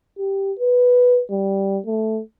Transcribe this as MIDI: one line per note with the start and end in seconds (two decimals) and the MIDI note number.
0.18 0.53 67
0.59 1.21 71
1.31 1.79 55
1.86 2.20 57